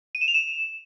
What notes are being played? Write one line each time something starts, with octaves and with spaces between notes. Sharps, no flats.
D#7
E7
F7
E7